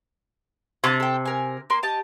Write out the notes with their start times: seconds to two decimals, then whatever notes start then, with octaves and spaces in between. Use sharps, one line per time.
0.84 C3 A5 C#6
1.00 A4 G5
1.25 A#4 G#5
1.70 A#3 C6
1.83 G4 D#5 A5